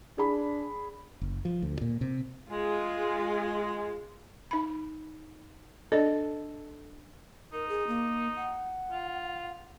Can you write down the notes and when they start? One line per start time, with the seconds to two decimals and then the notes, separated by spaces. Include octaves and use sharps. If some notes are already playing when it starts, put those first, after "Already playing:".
0.18 D4 G#4 B5
1.22 F#1
1.45 F3
1.62 D2
1.81 A#2
2.01 C3
2.51 G#3 F4 G#4
4.51 D#4 B5
5.92 D4 A4 D5 D#5
7.53 D#4 A#4
7.69 G#4
7.87 A#3
8.36 F#5
8.91 F4